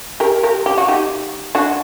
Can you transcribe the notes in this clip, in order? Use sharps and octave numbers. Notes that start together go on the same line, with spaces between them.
G4 A#4
G4 A#4
G4
F#4
D#4 G4
D4 F#4